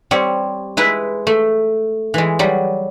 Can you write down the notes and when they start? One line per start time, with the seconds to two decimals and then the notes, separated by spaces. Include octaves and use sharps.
0.11 G3 C4 C#5
0.77 G#3 E4 B4
1.27 A3
2.14 E3 G#3
2.39 F#3 G3